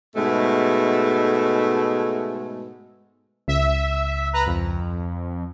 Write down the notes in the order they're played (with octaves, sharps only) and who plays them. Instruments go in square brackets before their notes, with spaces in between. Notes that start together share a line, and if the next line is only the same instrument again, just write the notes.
[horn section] G#2 B2 G#3 A3
[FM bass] C#2 [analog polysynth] E5
[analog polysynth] B4 A#5
F2